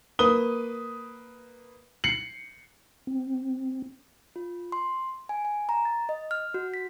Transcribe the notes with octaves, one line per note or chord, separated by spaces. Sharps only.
A#3 B4 D#6 G7
C7 C#7 F#7
C4
F4
C6
G#5
G#5
A#5
A6
D#5
F6
F#4
B6